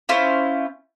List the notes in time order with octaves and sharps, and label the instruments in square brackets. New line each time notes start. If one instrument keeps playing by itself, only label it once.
[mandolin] C#4 E4 F4 C5